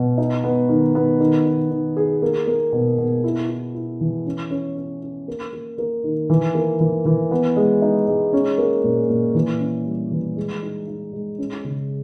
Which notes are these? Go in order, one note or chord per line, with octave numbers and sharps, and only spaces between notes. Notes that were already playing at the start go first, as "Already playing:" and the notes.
Already playing: B2
D#4
B3
D#3
B3
D#3
D#3
D#3
G#4
A#3
A#3
B2
B2
E4
E4
E4
E3
C#4
C#4
C#4
C#4
A#3
A#3
A#3
D#3
E3
A#3
E3
E3
B3
G#3
D#4
G#3
C#4
A#3
A#2
A#2
E3
C#4
G3
E3
G#3
D#4
D#4
G#3
C#4
C#3